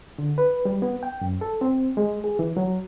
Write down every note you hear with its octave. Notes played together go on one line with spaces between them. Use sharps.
D3
B4
G3
B3
G5
F#2
A4
C4
G#3
G#4
E3
F#3